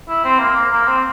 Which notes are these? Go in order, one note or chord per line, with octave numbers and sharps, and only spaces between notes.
E4
C4
A#3
A#3
A#3
C4